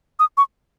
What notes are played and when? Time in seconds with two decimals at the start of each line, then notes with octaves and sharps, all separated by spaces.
0.19 D#6
0.37 C#6